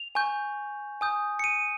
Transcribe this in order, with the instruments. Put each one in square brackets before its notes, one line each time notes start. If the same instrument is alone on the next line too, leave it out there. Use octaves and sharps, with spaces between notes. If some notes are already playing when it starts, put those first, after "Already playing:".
Already playing: [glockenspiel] F7
G#5 C#6 G6
G#5 D#6 G6
C#7
D#7